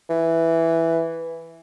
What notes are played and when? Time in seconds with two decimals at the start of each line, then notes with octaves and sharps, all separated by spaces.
0.09 E3